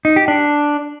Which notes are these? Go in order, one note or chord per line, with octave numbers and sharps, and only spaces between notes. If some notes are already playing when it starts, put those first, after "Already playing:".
D#4
G4
D4